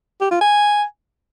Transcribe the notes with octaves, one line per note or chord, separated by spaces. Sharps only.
G4
F4
G#5